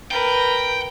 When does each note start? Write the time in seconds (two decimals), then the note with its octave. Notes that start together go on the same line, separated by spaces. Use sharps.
0.11 A#4 B4 G5